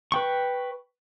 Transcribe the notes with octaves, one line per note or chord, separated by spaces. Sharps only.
B4 G5 C#6